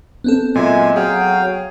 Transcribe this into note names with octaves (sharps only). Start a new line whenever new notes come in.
B3 C4 A4
A#2 F#3 G#3 E5 G#5
F#3 G#4 F5 G5